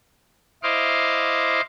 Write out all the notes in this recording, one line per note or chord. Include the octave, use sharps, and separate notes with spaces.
E4 C5 D#5 F5 C6 D6